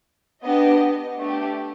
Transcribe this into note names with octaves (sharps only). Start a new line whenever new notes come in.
B3 D4 G4 D#5
A3 D4 G4